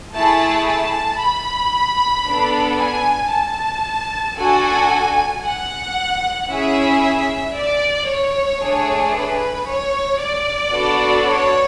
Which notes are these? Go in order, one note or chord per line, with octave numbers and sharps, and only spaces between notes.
A3 E4 G#4 A5
A5
B5
B3 D4 A4
G#5
A5
D4 F#4 A4 G#5
F#5
C#4 E4 G#4 E5
D5
C#5
A3 D4 G#4
B4
C#5
D5
B3 D4 F#4 A4
C#5